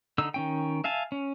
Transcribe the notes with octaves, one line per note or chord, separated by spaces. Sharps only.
D3 D#4 E6
D#3 C#4 G5
E5 F5 G#5 A5
C#4